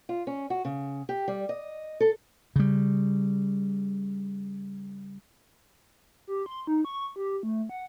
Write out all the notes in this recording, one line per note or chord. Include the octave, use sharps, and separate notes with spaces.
F4
C#4
F#4
C#3
G4
G3
D#5
A4
C#3 G3
G4
C6
D#4
C#6
G4
A3
F#5